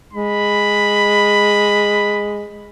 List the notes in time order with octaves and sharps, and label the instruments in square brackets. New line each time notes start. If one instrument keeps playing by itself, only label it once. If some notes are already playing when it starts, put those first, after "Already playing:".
[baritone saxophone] G#3 [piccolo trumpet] B5